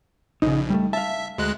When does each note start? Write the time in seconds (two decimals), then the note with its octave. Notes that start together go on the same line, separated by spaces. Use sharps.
0.42 A#1 C#3 D#4
0.70 G3 A3
0.93 E5 F5 A5
1.38 D2 G#3 F#6